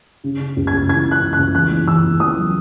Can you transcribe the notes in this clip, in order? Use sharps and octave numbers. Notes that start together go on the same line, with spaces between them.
C#3
C#3
C#2
G#6
C#2
E3 G#6
C#3
F#6
C#2
F#6
C#2
E2 F#6
E2
E2 E6
E2
E2 D#6
F#3